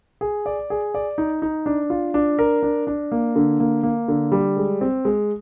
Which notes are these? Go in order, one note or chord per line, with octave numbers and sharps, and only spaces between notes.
G#4
D5
G#4
D5
D#4
D#4
D4
F4
D4
A#4
D4
D4
A#3
D3
A#3
A#3
D3
G3
G#3
C4
G#3